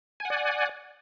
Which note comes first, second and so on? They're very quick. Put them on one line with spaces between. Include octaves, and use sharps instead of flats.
G#5 F#5 D5